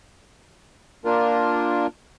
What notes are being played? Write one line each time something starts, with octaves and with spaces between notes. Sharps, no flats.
A#3 D4 F4 A#4